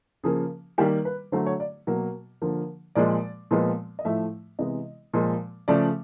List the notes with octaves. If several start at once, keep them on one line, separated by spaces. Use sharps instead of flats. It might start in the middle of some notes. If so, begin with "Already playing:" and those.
C#3 F3 A#3 G#4
D#3 G3 A#3 G4
B4
D3 F#3 A3 C5
C#5
D5
B2 F#3 A#3
D3 F3 A#3
A#2 F3 G#3 D5
A#2 F3 G#3 B3
D#5
A2 F3 A3 E5
C3 E3 G#3 B3 D#5
A#2 F3 G#3
C#3 F3 A3 D5